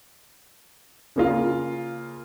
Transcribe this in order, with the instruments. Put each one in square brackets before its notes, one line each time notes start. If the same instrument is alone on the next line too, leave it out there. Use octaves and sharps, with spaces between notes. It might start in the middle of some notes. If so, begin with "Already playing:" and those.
[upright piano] C#3 A#3 F4